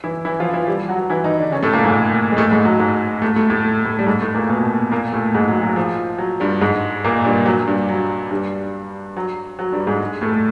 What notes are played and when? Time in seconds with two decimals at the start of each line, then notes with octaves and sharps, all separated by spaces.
0.04 E3 E4
0.25 E3 E4
0.40 F3 F4
0.54 E3 E4
0.67 G3 G4
0.89 F#3 F#4
1.10 E3 E4
1.24 D#3 D#4
1.39 D3 D4
1.52 C#3 C#4
1.63 A2 A3
1.73 A#2 A#3
1.84 G#2 G#3
2.32 G#3
2.37 A2 A3
2.51 G#2 G#3
2.65 F#3
2.80 G#2 G#3
3.22 A2 A3
3.36 A2 A3
3.50 A2 A3
3.85 A2 A3
3.99 G3
4.06 G#2 G#3
4.21 A2 A3
4.35 A#2 A#3
4.49 B2 B3
4.92 A#2 A#3
5.13 A2 A3
5.35 G#2 G#3
5.48 F#3
5.62 F#3
5.76 F3
6.18 F#3
6.40 G2 G3
6.61 G#2 G#3
7.04 A#2 A#3
7.25 G2 G3
7.46 F#3
7.67 G2 G3
7.89 F#3
8.31 G2 G3
9.17 F#3
9.59 F#3
9.72 G2 G3
9.87 G#2 G#3
10.21 A2 A3